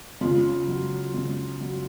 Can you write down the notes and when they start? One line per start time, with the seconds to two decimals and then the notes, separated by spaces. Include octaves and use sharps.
0.21 C#3 F4
0.68 F#3
1.14 C#3
1.61 F#3